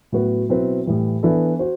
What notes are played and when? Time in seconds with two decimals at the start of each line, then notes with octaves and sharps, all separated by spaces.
0.12 A2 F#3 B3 F#4 B4
0.49 B2 F#3 C4 E4 B4
0.86 A2 E3 G3
1.23 E3 B3 D4 A4
1.59 F#4 C5